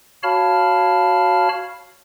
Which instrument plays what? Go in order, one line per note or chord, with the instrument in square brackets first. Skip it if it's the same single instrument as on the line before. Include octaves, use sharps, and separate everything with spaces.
[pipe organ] F#4 C#5 F5 A5 B5 F6